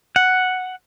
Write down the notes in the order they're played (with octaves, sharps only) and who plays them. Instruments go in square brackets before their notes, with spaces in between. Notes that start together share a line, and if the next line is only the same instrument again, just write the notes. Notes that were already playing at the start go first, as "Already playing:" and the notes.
[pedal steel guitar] F#5